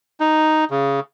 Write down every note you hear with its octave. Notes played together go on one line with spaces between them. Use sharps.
D#4
C#3